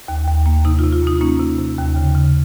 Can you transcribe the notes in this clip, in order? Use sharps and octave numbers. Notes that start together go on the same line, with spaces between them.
D#2
D#2
A#3
C3 D#4
F4
C3
F4
A#3 D#4
A#3 C#4
C3
C3
D#2
C#3
C#3